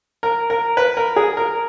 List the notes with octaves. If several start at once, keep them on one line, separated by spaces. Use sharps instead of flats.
A#4
A#4
B4
A#4
G#4
A#4